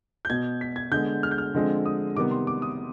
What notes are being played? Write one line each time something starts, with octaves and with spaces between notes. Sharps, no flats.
G6
B2 B3 G#6
B6
G#6
D3 G#3 B3 G6
F6
G6
F6
D3 F3 G#3 C4
D#6
C3 D#3 G3 B3 D6
C6
D6
D#6